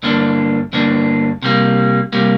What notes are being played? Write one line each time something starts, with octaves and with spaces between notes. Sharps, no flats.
G2 D3 A#3 D4
G2 D3 A#3 D4
C3 G3 A#3
C3 G3 A#3